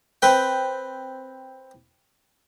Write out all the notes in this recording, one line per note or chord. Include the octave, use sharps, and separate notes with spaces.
C4 B4 G5